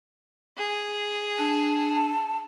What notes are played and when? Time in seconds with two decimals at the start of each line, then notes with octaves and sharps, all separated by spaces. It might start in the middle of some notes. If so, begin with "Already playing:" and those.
0.57 G#4
1.38 D4 A5